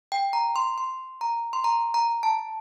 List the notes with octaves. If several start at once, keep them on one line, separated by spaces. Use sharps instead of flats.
G5
A#5
C6
C6
A#5
C6
A#5
A#5
A5